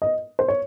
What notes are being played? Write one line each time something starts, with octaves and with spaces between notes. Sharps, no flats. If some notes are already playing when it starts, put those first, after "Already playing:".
D#5
C5
C#5